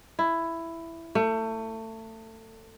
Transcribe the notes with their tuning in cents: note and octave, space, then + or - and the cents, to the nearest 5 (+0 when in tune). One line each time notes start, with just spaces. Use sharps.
E4 +10
A3 +25